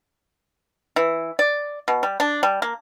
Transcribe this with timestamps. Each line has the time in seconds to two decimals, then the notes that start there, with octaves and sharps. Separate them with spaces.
0.96 E3
1.39 D5
1.88 B2
2.03 G3
2.20 D4
2.43 G3
2.62 A#3